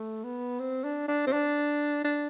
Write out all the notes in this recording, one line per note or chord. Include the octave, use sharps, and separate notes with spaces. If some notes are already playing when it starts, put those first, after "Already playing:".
Already playing: A3
B3
C4
D4
D4
C4
D4
D4